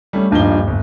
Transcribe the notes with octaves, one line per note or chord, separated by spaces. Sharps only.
G3 A3 C#4
D#1 G2 F3 D#4 G7
G1